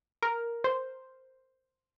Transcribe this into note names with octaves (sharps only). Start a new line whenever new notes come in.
A#4
C5